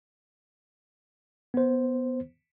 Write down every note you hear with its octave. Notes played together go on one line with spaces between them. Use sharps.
B3 C5